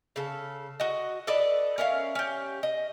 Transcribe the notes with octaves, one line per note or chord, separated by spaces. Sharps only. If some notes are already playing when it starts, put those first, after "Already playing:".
C#3 A4
F#4 D#5
A4 B4 D5 D#5
C#4 A#4 E5 F5
C#4 G4
D#5